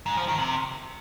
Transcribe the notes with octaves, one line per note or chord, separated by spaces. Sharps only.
G#2
F3
D#3
C3